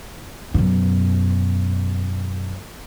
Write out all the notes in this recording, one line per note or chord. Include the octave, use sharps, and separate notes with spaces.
F#2 B2